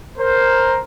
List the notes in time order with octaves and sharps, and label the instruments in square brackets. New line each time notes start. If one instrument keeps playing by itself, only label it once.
[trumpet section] A#4 C5